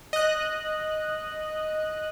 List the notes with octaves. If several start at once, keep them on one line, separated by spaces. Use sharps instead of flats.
D#5 F#6